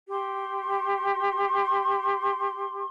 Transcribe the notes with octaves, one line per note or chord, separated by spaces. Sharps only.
G4 C6